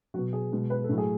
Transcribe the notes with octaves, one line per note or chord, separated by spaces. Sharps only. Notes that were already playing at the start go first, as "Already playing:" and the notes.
B2 F#3 F#4
G#4
B2 G#3
B4
A4
A2 F#3
G#4